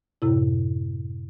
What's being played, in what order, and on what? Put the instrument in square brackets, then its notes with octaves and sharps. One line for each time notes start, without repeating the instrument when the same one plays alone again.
[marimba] F#2 A2 C3 E4